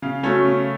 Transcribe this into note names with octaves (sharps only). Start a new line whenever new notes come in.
C#3 F5
F#3 A3 C#4 C#5
C#3